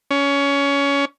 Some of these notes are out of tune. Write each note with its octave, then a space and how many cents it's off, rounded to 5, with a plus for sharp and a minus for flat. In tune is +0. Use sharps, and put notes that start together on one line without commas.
C#4 +20